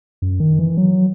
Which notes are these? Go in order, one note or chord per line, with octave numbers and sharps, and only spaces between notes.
F#2
D#3
E3
F#3